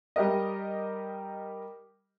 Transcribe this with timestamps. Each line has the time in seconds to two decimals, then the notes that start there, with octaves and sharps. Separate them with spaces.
0.16 G3 G4 A#4 D#5